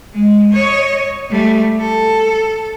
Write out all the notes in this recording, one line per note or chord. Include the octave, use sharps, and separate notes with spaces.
G#3
C#5 D#5
G3 A3
A4